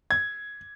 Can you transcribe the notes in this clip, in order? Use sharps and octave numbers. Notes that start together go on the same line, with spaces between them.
G#6